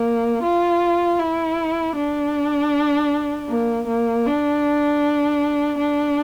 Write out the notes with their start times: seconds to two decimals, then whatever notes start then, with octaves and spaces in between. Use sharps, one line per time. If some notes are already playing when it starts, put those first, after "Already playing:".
Already playing: A#3
0.43 F4
1.19 E4
1.95 D4
3.49 A#3
3.87 A#3
4.26 D4
5.78 D4